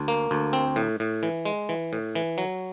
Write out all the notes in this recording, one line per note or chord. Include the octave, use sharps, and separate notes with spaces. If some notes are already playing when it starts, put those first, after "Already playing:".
Already playing: D2
A#3
D2
C4
A2
A2
E3
G#3
E3
A2
E3
F#3